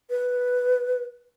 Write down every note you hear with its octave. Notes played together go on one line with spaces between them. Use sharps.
B4